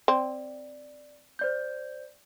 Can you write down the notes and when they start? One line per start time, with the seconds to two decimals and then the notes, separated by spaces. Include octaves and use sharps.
0.08 C4 D5
1.39 C5 D5 G6